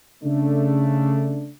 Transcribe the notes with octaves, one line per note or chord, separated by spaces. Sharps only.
C#3 A3 D4